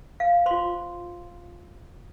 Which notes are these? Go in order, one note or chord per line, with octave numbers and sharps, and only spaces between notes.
F5
F4 C5 C6